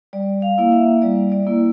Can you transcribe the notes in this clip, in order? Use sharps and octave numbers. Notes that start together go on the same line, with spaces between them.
G3 D5
F5
A#3 E4
E5
G3 D5
D5
A#3 E4